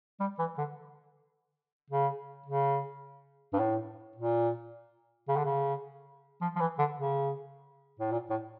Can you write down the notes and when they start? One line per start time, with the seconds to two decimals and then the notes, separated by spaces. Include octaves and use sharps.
0.20 G3
0.39 E3
0.58 D3
1.90 C#3
2.46 C#3
3.53 G2
3.59 A2
4.16 A#2
5.28 C#3
5.36 D3
5.45 C#3
6.41 F3
6.56 F3
6.60 E3
6.79 D3
6.98 C#3
8.00 A2
8.11 A#2
8.30 A2